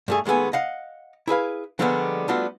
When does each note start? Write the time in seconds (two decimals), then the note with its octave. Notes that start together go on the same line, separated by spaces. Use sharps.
0.08 G2 A3 G#4
0.25 D#2 G#3 A3 B3 G#5
0.53 D#5 F5 F#5
1.28 E4 G#4 B4 F5
1.79 D3 F3 G3 G#3 A#3 B3
2.28 G3 A3 B3 D4 F4 F#4